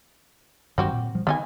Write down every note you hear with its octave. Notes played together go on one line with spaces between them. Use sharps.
G2 D#3 F#3 C4 F#4 G4
A#2
F3 G3
D3 D#3 B3 D#4 G#5